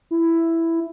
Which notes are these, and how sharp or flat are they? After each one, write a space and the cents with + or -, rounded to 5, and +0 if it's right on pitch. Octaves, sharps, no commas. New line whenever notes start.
E4 +5